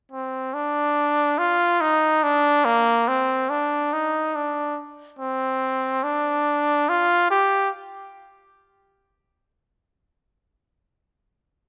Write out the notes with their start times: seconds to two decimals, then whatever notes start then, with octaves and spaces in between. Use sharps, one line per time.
0.12 C4
0.54 D4
1.38 F4
1.81 D#4
2.23 D4
2.65 A#3
3.08 C4
3.50 D4
3.93 D#4
4.35 D4
5.19 C4
6.03 D4
6.89 F4
7.31 G4